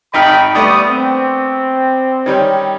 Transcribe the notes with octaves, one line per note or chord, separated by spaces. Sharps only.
G#1 D#4 G5 B5 F6
G3 A3 B3 D4 D#6
C4
D#3 G3 C#4